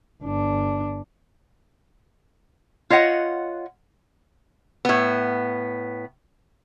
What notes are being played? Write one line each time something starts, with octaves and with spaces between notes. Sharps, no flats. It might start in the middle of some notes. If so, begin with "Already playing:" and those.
G1 D4
F4 C#5 D#5 F#5
A2 B3